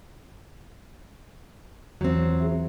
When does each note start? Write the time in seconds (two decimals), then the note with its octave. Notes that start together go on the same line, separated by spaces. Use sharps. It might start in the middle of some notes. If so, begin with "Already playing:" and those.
2.01 E2 E3 F#3 C4 F4
2.40 G#4 E5